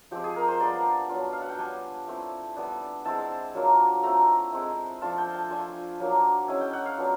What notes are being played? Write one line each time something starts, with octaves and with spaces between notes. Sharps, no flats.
F3 G#3 C4 G4
G#4
A#4
C5
G3 B3 D4 F4 D5
F#3 B3 D4 F4
F5
F#5
G5
G3 B3 D4 G#5
A3 C4 E4
G3 B3 D4
G#3 C4 E4 A5
F#3 A#3 D4 F4
A3 C4 E4 A#5
G#3 C4 E4
F3 A3 D4 F4 A5
G5
A5
A3 D4 F4 G#5
F#3 A#3 D4
G#3 C#4 E4 G#5
G5
F#5
F5
F#3 B3 D4 F4